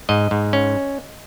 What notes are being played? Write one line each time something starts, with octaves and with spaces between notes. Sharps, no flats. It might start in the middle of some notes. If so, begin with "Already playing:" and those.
G#2 D#5
G#2
C#4